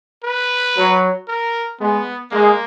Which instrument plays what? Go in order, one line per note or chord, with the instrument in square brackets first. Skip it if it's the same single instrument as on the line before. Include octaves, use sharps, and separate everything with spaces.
[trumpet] B4
[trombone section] F#3
[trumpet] A#4
[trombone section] G#3 [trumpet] B3
[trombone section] G#3 [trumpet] A#3